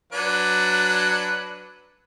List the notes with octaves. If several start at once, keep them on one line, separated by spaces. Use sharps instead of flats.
F#3 D4 B4